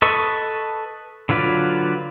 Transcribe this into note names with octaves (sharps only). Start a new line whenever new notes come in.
A4 B4 D#5 C#6
D3 F#3 F4 B4 D5